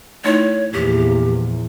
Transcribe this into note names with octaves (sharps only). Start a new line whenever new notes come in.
A3 D#4 E4 C#5
E2 A#2 F3 G4